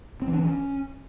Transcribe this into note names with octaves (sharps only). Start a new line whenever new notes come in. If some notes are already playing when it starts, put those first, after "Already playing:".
C4
E3
D4
E3
C#4